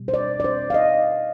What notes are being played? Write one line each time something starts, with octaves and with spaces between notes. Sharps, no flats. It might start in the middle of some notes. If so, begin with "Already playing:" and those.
Already playing: B2 G3
C5
D5
D5
C5
F5
D#5